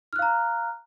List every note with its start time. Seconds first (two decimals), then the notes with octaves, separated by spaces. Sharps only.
0.13 F6
0.16 F#6
0.19 F5
0.22 A#5